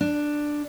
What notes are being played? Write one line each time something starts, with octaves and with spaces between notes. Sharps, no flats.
D4